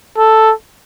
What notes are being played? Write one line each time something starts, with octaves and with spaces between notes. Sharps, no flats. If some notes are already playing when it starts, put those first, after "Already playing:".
A4